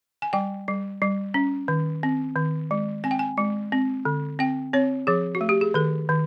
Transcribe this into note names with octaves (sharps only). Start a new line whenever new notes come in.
G#5
G3 G5
G3
G3
C#4
D#3
C4
D#3
G#3
C4 G#5
G5
G#5
G#3
C4
D3
C4 G5
C4 C#5
F3 G#4
F#4
A3
G4
G#4
D#3 A4
D#3